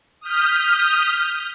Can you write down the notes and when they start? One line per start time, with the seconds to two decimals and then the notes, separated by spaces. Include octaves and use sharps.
0.20 D#6 F6 G6 B6